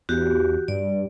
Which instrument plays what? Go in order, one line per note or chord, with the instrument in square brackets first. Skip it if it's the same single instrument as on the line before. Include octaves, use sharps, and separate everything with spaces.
[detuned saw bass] E2 [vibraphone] F#4 G4
[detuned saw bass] G2 [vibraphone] D5